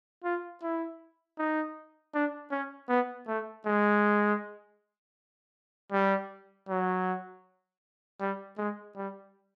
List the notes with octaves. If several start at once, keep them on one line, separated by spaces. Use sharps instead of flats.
F4
E4
D#4
D4
C#4
B3
A3
G#3
G3
F#3
G3
G#3
G3